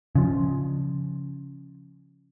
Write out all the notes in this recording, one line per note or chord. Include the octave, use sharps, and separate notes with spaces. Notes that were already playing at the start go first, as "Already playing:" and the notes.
C#3 F3